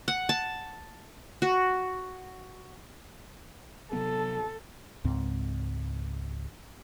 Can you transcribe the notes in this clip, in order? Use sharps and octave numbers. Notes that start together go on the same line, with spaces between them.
F#5
A5
F#4
C3 F#3 B3 A4
C#2 G#2 C4